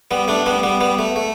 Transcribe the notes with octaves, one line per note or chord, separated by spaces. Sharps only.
G3 B3
A3 D4
G3 B3
G3 B3
G3 B3
A3
A3